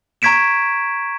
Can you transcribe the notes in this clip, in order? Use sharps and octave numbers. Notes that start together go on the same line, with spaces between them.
A#5 C#6 G#6 B6 D7 E7